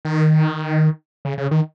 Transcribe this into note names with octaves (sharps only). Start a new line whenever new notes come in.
D#3
C#3
C#3
D#3